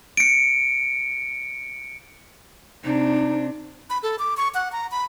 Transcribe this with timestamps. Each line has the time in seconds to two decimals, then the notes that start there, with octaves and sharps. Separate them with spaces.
0.17 C#7 D7
2.84 C3 D4 D#4
3.90 B5
4.03 A4
4.19 D6
4.37 C#6
4.54 F#5
4.72 A#5
4.91 B5